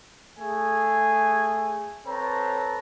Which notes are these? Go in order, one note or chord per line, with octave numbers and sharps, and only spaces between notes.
A3 G#4 G#5
C4 A4 B4 C#5 A5 A#5